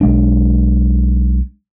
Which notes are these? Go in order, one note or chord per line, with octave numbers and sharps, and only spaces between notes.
B1 G#3 D4